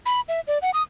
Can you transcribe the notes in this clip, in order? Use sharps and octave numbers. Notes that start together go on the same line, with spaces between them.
B5
E5
D5
F#5
D#6